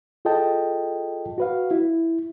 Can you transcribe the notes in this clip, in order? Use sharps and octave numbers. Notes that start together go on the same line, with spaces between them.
F4 G#4 A4 D#5 G5 A5
F#4 B4 F5
E4